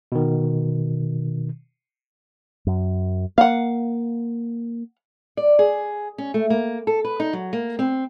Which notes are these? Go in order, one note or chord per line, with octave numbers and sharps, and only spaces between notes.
B2 D#3
F#2
A#3 F5 F#5
D5
G#4
C#4
A3
A#3
A4
B4
D#4
F#3
A#3
C4